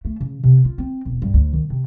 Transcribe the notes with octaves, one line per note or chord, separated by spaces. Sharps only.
A3
C#3
C3
F4
C4
E1
G2
D2
D#3
C3